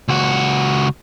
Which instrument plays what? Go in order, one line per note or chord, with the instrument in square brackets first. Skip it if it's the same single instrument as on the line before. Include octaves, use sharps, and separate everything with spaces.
[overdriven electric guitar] C#2 F#4